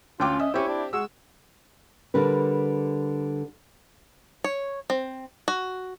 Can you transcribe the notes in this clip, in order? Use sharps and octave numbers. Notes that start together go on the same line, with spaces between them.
D2 C#4 F4 G5 D6
D#5 E5
C4 C#4 E4 G4
D4
G#3 F#4 E6
D3 G3 A#4 B4
C#5
C4
F#4